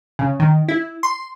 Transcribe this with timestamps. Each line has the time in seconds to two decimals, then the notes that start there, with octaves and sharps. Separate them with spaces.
0.19 C#3
0.40 D#3
0.68 E4
1.03 C6